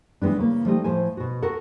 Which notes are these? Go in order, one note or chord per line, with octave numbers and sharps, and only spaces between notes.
E3 G#3 B3 D4
C#3 A#3
F3 G3 A3 A#3 D#4 G4
A2 F3 C5 G#5
B2 F#4
F#4 A4 A#4 F#5